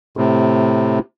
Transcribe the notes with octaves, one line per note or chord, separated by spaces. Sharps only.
A2 C3